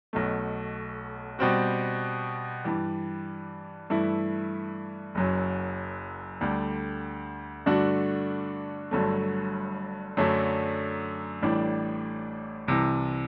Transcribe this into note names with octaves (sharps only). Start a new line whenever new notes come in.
B1 B2 A3
B2 G3 C4 F#4
G2 E3 G3
G2 E3 A3 E4
F#1 F#2 F#3
D2 D3 G3
G2 D3 A3 D4 F#4
G1 G2 D3 F#3 A3
F#2 D3 F#3 A3 D4
A1 A2 E3 G3 D4
C2 C3 E3